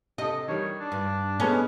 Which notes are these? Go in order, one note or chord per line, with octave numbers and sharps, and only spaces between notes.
C3 A4 D#5
D#3 G3 C#5
D4
G2
G#3 B3 C#4 A4